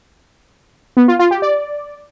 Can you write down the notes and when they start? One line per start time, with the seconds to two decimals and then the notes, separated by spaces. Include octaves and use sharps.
0.97 B3
1.08 F4
1.19 F4
1.31 G4
1.42 D5